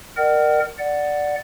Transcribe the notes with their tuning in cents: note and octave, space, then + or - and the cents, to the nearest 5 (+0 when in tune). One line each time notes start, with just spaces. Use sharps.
A#4 +0 D5 +45 F#5 +40
D5 +0 F#5 +0